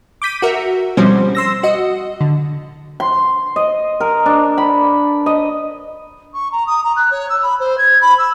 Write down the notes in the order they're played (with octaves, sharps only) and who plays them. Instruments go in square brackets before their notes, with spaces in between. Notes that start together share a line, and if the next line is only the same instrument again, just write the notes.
[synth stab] D6 G6 B6 D#7
F#4 A#4 E5
B2 F3 G3 C4 C#4 C5
C6 E6 A#6
F#4 D#5
D3
[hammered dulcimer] C6
D#5
A#4
D4
B5
D#5
[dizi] C#6
A#5
D#6
A#5
F#6
C#5
E6
B5
C5
G#6
B5
E6